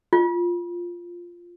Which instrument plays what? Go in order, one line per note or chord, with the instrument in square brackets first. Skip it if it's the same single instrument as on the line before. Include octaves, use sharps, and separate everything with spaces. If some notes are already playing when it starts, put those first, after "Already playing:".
[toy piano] F4